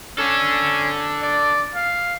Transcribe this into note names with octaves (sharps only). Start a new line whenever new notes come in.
C#4 D4 A4
D5
F5